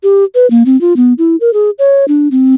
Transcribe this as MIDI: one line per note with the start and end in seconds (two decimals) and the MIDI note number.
0.03 0.24 67
0.35 0.49 71
0.50 0.63 58
0.66 0.79 60
0.81 0.96 65
0.96 1.13 59
1.18 1.36 64
1.41 1.53 70
1.53 1.70 68
1.79 2.05 73
2.08 2.28 62
2.31 2.55 60